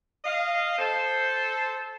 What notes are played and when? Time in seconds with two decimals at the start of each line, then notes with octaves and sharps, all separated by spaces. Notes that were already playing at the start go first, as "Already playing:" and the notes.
0.25 D#5 F5
0.78 A4 C5